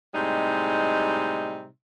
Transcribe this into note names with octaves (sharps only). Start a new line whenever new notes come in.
A2 C3 G3 G#3 D#4